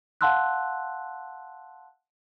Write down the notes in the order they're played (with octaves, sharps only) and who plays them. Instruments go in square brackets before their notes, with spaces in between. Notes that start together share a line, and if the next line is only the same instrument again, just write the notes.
[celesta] F5 F#5 A5 C6 E6 F#6